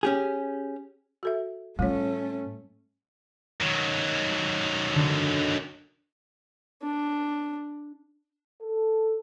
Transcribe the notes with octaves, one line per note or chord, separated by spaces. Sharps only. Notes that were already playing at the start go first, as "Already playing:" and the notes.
C#4 G4 G#4
F#4 A4 E5
A2 G3 A3 C#4 F4 C#5
D#3 F#3
D3
D4
A4